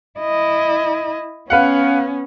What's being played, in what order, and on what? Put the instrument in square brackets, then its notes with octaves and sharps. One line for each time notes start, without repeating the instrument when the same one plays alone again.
[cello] E4 D#5
[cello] B3 C#4 [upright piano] B4 F5 F#5